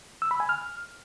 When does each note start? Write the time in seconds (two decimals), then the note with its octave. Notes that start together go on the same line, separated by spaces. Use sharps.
0.22 E6
0.31 B5
0.40 G#5
0.49 F6